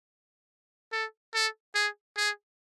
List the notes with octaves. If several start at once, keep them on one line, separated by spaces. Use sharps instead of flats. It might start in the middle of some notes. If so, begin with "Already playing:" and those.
A4
A4
G#4
G#4